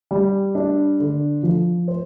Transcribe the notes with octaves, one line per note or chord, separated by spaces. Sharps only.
G3
D4
D3
F3
C5